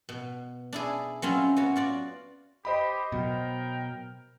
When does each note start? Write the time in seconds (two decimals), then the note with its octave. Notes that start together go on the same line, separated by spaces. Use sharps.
0.09 B2
0.73 D4 E4 G#4
1.22 F#3 C4 C#4 E4 F4
1.57 B3 F#4 C#5
1.76 F4 F#4 D5
2.65 G4 C5 D#5 B5
3.12 B2 F#3 A#4 G5